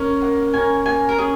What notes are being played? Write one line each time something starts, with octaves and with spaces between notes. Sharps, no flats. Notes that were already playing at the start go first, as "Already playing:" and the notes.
Already playing: A#3 C#4 A#4
A#3 F#5
C#4 A#4 G#5
A#3 G#5
A#4
C#4 G#4